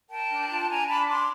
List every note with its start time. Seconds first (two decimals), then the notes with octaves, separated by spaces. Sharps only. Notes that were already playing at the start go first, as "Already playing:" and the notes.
0.10 A#4 G5 A5
0.30 D4
0.49 F4
0.68 D4 G#5 A#5
0.88 D4 A5 B5
1.08 D4 C6 D6